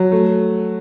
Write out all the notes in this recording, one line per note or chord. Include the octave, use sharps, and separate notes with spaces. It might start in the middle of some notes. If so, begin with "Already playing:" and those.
Already playing: F#3
A3